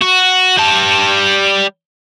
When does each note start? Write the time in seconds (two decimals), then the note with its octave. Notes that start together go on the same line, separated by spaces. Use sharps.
0.02 F#4
0.57 G3 A5